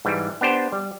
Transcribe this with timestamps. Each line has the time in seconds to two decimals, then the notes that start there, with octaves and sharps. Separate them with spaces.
0.05 G#2 E3 G3
0.41 B3 D4 G4 C5
0.72 G3